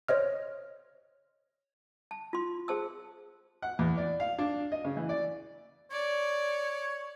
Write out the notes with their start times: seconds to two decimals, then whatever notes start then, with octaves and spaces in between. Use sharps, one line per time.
0.08 C5 C#5 D#5 F6
2.11 A5
2.33 F4 C6
2.68 G#4 C5 A5 E6
3.62 F#5
3.79 E2
3.97 D5
4.20 F5
4.38 D4
4.72 D#5
4.85 C#3
4.97 E3
5.09 D5
5.91 C#5 D5